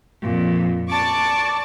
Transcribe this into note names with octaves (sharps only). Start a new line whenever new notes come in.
F2 A#2
D5 A5 C#6 D6